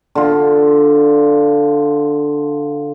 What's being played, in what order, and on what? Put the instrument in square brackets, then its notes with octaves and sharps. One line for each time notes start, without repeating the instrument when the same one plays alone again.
[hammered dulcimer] D3 F4